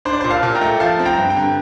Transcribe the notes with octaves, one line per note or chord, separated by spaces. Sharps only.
D4 C5
D5
A#2 C5
F5 A5
A#2
G5 A#5
A3
F3 F5 A5
C4
G5 A#5
G2
G5 A#5
D3